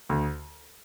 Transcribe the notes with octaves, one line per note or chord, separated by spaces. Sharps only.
D2